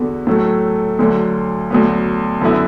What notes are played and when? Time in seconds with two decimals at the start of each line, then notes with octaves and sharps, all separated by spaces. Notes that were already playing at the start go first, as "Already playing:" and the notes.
Already playing: E2 D3 B3 F#4
0.27 A2 F#3 A3
0.99 D2 D3 F#3
1.70 D2 D3 F#3 B3
2.41 F#2 D3 B3 E4